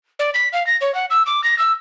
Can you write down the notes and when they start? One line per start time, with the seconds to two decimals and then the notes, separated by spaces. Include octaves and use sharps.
0.19 D5
0.34 B6
0.53 F5
0.67 A#6
0.81 C#5
0.95 F#5
1.10 E6
1.26 D6
1.44 A#6
1.59 E6